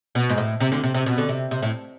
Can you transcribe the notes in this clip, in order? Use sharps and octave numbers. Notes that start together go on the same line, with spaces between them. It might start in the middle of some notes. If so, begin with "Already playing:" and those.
B2
G#2
A2
C3
D2 D3
C3
C3
B2
D3
C3
C3
A2